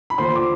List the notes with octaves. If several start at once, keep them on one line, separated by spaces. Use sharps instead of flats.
B5
D#2 D3 F3 C5 C6
D6